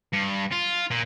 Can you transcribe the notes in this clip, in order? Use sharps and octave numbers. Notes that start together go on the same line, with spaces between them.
G2
F4
A#2